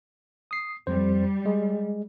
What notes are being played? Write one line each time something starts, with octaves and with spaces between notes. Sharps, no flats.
D#6 C7
F2 G3 C5
G#3 G#4